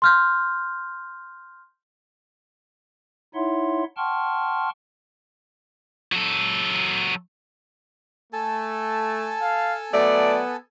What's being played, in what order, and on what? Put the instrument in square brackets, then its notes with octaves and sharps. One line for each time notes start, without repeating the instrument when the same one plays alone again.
[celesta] C6 F6 G6
[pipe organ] D#4 E4 C#5 E5 F#5 C6
F#5 G5 A5 C6 C#6 F6
[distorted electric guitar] F#3 A4
[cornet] A3 [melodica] A4 G#5 A5
[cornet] F5
[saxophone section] F#3 A3 D5 [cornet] B3